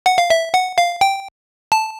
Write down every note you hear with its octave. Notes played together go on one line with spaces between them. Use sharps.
F#5
F5
E5
F#5
F5
G5
A5